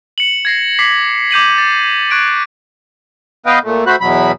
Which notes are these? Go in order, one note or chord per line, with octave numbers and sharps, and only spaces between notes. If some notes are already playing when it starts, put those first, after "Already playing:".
C#7 E7 F#7
G#6 A#6 C7
D6 B6 C7
D6 G6 D#7 F#7
A6
C#6 F#6 G#6 D7 F#7
B3 B4 D#5 F5 G5
A#2 A3
A3 F#4 C5 B5 F#6
E2 B2 F#3 B5